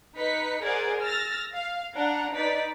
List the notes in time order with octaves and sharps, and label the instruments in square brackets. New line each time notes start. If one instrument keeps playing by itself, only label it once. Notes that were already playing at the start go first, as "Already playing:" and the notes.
[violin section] D#4 B4 B6 C#7
G#4 A#4 C5 D5 F#5
E6 F6 A6 A#6
F5
D4 F#5 A#5
D#4 B4 D5 B6